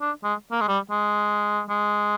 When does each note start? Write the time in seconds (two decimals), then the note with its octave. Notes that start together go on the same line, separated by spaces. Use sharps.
0.01 D4
0.24 G#3
0.52 A#3
0.61 G#3
0.68 G3
0.91 G#3
1.69 G#3